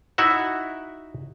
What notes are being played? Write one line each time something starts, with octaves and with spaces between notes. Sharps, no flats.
D#4 E4 F#4 E5 F#5